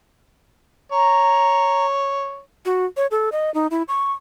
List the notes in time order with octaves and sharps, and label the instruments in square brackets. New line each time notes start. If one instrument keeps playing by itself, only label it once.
[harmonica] C#5 [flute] A#5
[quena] F#4
C#5
A4
D#5
D#4
E4
C#6